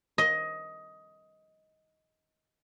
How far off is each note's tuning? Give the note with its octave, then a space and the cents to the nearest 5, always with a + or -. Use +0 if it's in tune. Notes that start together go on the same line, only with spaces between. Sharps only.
D#5 +15